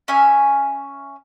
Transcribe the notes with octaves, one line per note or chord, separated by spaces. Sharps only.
C#4 E5 G#5